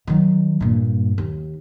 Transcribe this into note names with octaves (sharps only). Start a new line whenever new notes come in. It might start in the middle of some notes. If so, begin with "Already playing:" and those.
D#3 F#3
G2 A#2
D#2